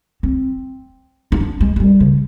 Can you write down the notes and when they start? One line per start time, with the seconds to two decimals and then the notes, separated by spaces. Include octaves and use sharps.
0.23 C4
1.32 D#4
1.40 D4
1.61 G#3
1.76 G#3
1.80 G3
2.00 C#3